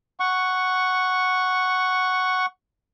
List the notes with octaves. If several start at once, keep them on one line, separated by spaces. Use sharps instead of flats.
F#5 C#6